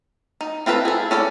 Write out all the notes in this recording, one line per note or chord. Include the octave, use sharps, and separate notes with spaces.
D#4
C4 F4 A4 B4
G#4 A4
C#4 A4 D5